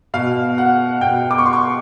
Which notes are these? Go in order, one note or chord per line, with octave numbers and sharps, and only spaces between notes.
B2 F5
F#5
B2 G5
D6
C#6
C6
C#6